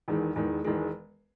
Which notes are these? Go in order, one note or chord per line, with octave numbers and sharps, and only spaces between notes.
E1 E2 D#3 G#3
E1 E2 D#3 G#3
E1 E2 D#3 G#3